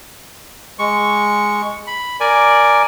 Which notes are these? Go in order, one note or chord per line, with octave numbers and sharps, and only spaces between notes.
G#3 C#6
B5
A#4 D5 G#5